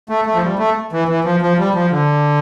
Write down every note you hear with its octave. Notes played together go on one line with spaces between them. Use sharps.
A3
A3
F3
G3
A3
E3
E3
F3
F3
G3
F3
D3